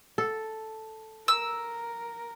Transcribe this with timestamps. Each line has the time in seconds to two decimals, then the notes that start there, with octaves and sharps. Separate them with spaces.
0.18 A4
1.28 A#4 E6